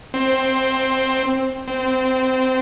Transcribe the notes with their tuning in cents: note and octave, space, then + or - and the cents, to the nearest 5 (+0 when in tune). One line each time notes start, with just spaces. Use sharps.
C4 +10
C4 -15